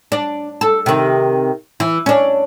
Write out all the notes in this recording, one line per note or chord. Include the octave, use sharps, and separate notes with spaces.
D4
A4
C3 D#3
E3
C#4 D4